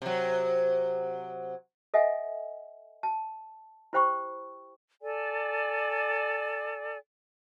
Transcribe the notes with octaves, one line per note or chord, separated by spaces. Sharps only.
C3 F#3
A4 D#5 E5 F#5 G#5
A5
E4 G4 C5 G5 B5 C#6
A4 D5 G#5